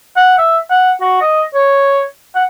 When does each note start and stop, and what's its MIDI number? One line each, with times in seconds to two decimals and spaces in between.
0.16 0.36 78
0.38 0.58 76
0.70 0.91 78
1.01 1.18 66
1.21 1.42 75
1.54 2.04 73
2.35 2.44 78